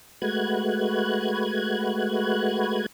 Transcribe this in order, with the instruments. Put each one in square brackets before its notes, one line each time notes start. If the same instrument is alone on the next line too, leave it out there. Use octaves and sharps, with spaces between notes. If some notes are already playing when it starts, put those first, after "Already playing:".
[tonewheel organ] G#3 A3 F#4 B4 F#6 G#6